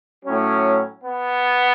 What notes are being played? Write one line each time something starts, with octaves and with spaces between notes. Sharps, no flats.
A2 F#3 C#4
B3